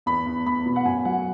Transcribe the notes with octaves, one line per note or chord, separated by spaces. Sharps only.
E2 B5
E2
E2 B5
B2
F#5
F#2 G#5
F#3 F#5